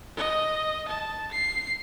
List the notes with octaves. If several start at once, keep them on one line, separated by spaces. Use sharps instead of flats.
D#5
A5
C7